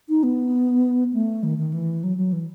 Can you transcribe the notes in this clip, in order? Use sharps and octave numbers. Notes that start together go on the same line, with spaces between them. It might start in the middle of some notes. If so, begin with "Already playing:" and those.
D#4
B3
A3
D#3
D#3
E3
F#3
F#3
E3